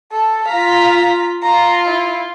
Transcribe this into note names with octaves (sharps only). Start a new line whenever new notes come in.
A4
F4 F5 A#5 B6
F4 A#5
E4